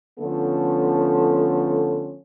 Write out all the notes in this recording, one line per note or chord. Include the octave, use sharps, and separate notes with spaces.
D3 F3 A3 B3 C#4 A4